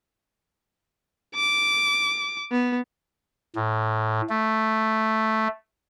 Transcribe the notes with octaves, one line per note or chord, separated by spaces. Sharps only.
D6
B3
A2
A3